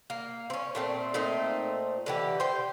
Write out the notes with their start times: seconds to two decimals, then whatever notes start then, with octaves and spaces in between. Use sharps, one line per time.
0.10 A#3
0.50 C4 C#4
0.75 A#2 A3 C4
1.14 A#2 A3 C4 D#4
2.06 D3 E3 G4
2.40 C5 G5